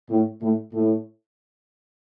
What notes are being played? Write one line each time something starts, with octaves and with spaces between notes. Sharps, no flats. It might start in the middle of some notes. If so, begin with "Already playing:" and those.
A2
A2
A2